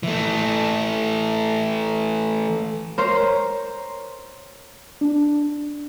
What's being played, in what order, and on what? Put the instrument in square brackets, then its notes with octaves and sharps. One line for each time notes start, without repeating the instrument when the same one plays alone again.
[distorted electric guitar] E3 A3
[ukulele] A#4 C5 C#5
[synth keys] D4